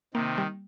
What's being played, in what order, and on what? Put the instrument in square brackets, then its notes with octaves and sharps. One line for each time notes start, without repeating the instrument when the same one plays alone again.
[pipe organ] C3 D#3 [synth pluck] A#3
[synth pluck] G3